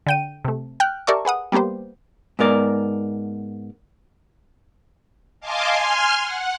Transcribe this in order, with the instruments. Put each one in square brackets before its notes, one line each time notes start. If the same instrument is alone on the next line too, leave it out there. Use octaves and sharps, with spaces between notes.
[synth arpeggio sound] D3 G5 D#7
C3 A3
G5 F6 F#6
G4 A#4 D5 E5 A5 C#6
G#4 B4 F#5 D#6
G3 A#3 B3 G4 C5
[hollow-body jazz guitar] G#2 B3 A#4 D5
[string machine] D#5 F5 G#5 A5 C6 D6
G#5 C6 F6
F#5